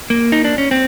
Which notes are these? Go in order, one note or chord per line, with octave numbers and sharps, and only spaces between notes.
A#3
D#4
D4
C#4
C4